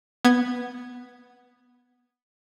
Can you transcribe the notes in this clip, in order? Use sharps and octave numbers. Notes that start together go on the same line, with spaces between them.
B3 G#6